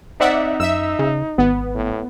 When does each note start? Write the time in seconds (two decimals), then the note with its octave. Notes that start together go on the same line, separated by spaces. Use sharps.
0.21 C4 D#4 D5 E5 F#5
0.60 F#2 E5 E6
0.99 C#3
1.38 G#1 B3
1.75 A2